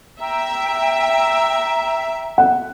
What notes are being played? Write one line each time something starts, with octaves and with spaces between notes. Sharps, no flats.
E5 G5 A#5
F#5